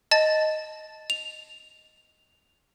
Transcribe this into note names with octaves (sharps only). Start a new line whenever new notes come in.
D#5 A5 A6
F7